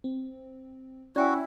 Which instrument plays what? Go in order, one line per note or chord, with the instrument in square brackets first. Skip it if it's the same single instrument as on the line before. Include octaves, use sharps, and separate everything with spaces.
[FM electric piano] C4
[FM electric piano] C#4 [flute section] E4 [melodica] F#4 [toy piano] D5 G5 G#5